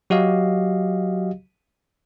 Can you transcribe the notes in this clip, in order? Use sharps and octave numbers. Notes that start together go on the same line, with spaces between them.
F#3 F#4 G4 D#5 F5